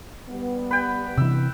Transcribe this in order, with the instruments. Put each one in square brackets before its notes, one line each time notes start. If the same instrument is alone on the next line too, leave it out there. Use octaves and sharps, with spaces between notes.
[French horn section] G3 B3
[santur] B4 G5
[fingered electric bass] C3 E3 [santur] E6